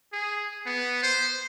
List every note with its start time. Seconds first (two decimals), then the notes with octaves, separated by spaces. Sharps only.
0.13 G#4
0.66 B3
1.03 C5